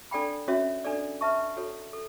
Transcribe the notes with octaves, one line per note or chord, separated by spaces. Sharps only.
D4 A4 D5 G5 B5
C#4 F#4 C#5 E5
D4 A4 D5
B4 E5 A5 C#6
F#4 A4 C#5 F#5
A4